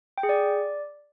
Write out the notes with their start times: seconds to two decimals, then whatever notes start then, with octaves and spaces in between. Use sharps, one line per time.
0.18 G5
0.23 G#4
0.29 D5